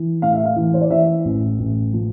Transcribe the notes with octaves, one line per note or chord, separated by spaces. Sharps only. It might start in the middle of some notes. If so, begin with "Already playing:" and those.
Already playing: E3
A2 F5
E5
F5
E3
C5
D5
E3 E5
A1
A1
F3